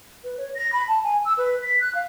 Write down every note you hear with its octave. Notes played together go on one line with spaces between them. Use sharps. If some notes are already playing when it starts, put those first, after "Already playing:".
B4
C#5
A#6
B5
A5
G#5
E6
B4
B6
F#6
F5